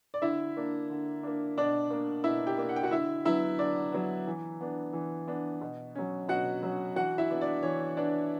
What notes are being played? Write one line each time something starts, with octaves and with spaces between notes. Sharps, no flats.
D5
D3 E4 E5
A#3 D4
D3
A#3 D4
B2 D4 D5
A#3 D4
B2 E4 E5
G4 G5
A#3 D4
F#5
G5
F#4 F#5
D3 E4 E5
F#3 B3 E4 E5
D3 D4 D5
F#3 B3
E3
B3 D4
E3
B3 D4
B2
F#3 C#4
B2 F#4 F#5
F#3 C#4
E3 F#4 F#5
E4 E5
B3 D4
D4 D5
E3 C#5
B3 D4 D5